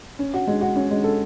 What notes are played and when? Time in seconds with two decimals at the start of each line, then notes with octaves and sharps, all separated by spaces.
0.19 C#4
0.34 F#4
0.47 G#3
0.61 F#4
0.76 C#4
0.91 G#3
1.04 A4